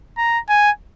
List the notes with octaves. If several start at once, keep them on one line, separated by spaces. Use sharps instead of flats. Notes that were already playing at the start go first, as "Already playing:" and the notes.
A#5
G#5